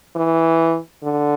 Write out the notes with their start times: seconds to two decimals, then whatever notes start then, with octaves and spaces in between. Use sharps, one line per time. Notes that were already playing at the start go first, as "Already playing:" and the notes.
0.16 E3
1.03 D3